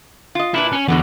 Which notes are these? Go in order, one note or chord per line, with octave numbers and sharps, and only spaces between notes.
F4 D#5
A#2 D4 E4 B4
C#4
E2 B2 D3 B3